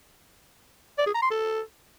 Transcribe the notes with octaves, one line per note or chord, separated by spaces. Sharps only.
D5
G#4
A#5
C6
A4